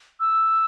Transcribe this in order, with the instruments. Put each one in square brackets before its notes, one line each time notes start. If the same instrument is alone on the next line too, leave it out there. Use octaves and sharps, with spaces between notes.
[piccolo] E6